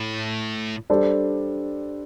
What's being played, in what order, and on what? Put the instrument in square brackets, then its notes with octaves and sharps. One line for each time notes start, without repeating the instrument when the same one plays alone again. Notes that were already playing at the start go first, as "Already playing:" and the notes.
Already playing: [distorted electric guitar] A2
[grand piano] G3 D4 A4 C5